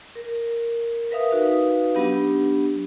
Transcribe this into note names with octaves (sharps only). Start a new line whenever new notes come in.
A#4
A#4 B4 E5 F5 D#6
D#4 F#4 B4 F5
F#3 B3 D4 G4